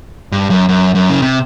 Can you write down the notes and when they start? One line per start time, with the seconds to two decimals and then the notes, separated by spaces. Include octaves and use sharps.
0.32 G2
0.50 F#2
0.69 F#2
0.95 F#2
1.10 C#3
1.22 C3